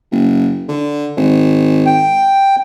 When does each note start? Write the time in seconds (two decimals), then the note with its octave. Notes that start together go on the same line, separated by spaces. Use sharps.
0.12 F#1
0.69 D3
1.17 G#1
1.86 G5